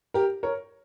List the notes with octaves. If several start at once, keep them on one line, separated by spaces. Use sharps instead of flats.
G4 A#4
A#4 C#5